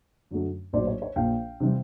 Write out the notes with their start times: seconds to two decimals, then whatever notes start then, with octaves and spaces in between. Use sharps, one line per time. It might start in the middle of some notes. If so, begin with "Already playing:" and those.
0.31 F#2 D3 F#3 A3
0.73 A#1 A2 F#3 C5 D5
0.87 C#5
1.02 C#5
1.16 A#1 A#2 F3 F5 G5
1.60 C3 E3 G3 C4